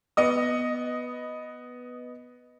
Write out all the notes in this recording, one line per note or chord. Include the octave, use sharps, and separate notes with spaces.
B3 D#5 D#6